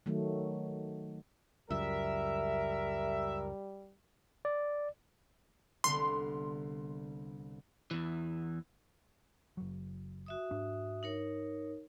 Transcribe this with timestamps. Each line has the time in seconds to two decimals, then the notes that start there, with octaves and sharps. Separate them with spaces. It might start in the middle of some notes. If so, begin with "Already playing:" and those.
0.06 D#3 F#3 A3
1.70 C#2 F#2 G3 A#4 E5
4.45 D5
5.84 C2 D3 B3 C6
7.91 E2 E3
9.57 F#1 F#3
10.26 F#4 E5 D#6
10.51 G#2 D4
11.03 D#4 A#4 C#5